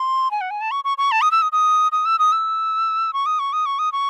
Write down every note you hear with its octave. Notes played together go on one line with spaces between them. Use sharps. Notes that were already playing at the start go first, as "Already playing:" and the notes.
Already playing: C6
G#5
F#5
G#5
A5
C#6
C#6
C#6
A5
D#6
E6
D#6
D#6
D#6
E6
D#6
E6
C#6
D#6
C#6
D#6
C#6
D#6
C#6